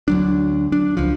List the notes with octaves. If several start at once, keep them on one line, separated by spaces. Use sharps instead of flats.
D2 F#3 D4
D4
C#2 F3